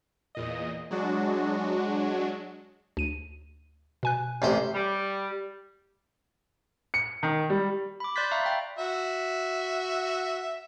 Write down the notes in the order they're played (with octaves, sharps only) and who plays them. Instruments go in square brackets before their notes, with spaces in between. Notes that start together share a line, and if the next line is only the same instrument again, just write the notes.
[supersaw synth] E2 A#2 D#5
F#3 G#3 D4 F#4
[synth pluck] D2 D#7
B2 G#5 F#6
[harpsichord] A1 C3 C5
[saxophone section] G3
[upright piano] C#7
D#3
G3
[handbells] B5 D6
D5 C6 F#6 G6 A6 B6
D5 E5 F5 A#5 B5 C#6
G5
[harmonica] F#4 E5